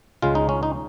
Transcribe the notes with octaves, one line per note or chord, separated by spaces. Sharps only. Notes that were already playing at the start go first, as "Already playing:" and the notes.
C#2 C#3 G#3 F4
D#4
C#4
D#4